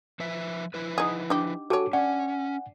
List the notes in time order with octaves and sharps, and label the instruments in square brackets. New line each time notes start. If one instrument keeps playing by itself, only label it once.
[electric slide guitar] F3 B4 E5
F3 E4 B4
[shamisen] D#4 G#4 [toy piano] F#5
[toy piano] D4 D6 [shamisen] D#4 G4
[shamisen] G3 C#5 [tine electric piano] F#4 A4 [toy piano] G#5 A5 D6
[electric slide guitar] C#4 [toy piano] D5 [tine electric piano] F#5 G#5